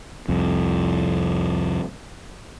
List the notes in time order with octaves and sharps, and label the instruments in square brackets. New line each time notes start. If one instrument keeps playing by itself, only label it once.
[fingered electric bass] C2 F2